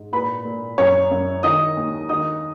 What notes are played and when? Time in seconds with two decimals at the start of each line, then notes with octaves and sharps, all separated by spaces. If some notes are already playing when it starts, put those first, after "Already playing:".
Already playing: G#2
0.12 A#2 B4 B5
0.45 A#2
0.78 F#2 C#5 C#6
1.11 F#2
1.43 D#3 D#5 D#6
1.77 D#2
2.09 D#3 D#5 D#6